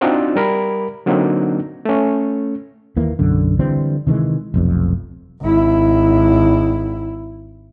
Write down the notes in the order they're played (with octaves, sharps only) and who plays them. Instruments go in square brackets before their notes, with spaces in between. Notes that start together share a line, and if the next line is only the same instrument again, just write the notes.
[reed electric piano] C4 D4 D#4 F4 F#4 C5
G3 A#4 B5
D3 F#3 A#3 C4 D4 D#4
A3 C#4
[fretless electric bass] D#2 E3 A#3
B1 F#2 D3
D3 E3 G3 C4
C3 D#3 E3 G#3
F1 B1 F2
[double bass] G#1 E4